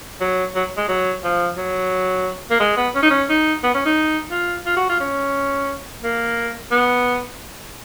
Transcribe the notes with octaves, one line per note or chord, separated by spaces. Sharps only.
F#3
F#3
G#3
F#3
F3
F#3
A#3
G#3
B3
C#4
D#4
C#4
D#4
B3
C#4
D#4
F4
F4
F#4
F4
C#4
A#3
B3